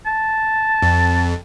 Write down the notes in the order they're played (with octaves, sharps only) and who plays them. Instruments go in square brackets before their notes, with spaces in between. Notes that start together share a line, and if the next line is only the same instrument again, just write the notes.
[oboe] A5
[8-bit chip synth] F2